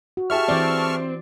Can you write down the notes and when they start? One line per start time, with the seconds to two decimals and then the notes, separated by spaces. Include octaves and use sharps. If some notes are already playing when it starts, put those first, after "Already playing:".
0.17 F#4
0.30 G4 G#4 E5 A5 C#6 F6
0.48 E3 C4 D5